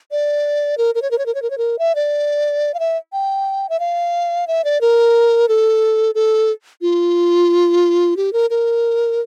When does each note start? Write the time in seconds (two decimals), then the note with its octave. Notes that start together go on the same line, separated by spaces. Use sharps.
0.11 D5
0.78 A#4
0.95 A#4
1.02 C#5
1.11 A#4
1.18 C#5
1.26 A#4
1.35 C#5
1.42 A#4
1.50 C#5
1.58 A#4
1.79 E5
1.95 D5
2.74 F5
2.79 E5
3.13 G5
3.69 E5
3.80 F5
4.48 E5
4.64 D5
4.81 A#4
5.49 A4
6.15 A4
6.82 F4
8.17 G4
8.33 A#4
8.50 A#4